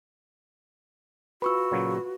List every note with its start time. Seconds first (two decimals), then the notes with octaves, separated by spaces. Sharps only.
1.42 F4 F#4 B4 B5 C#6 E6
1.71 A#2 C#3 F#3